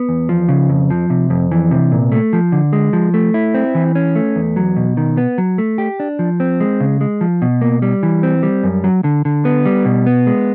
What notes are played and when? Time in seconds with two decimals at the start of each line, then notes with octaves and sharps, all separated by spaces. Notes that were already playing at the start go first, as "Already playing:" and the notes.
Already playing: B3
0.09 E2
0.29 F3
0.48 C#3
0.69 F2
0.90 F3
1.10 C3
1.30 F2
1.52 E3
1.71 C3
1.92 A#2
2.12 A3
2.33 F3
2.52 D3
2.73 G#3
2.93 F3
3.14 A3
3.34 E4
3.54 C4
3.75 E3
3.95 C#4
4.16 A3
4.36 E2
4.56 F#3
4.76 B2
4.97 D#3
5.17 B3
5.38 F#3
5.58 A3
5.78 G4
6.00 D4
6.19 F3
6.40 C4
6.60 G#3
6.80 C#3
7.01 G#3
7.21 F3
7.42 B2
7.61 A#3
7.82 G3
8.03 E3
8.23 C4
8.43 G3
8.64 F#2
8.84 F#3
9.04 D3
9.25 D3
9.45 B3
9.65 G3
9.85 B2
10.06 B3
10.27 G#3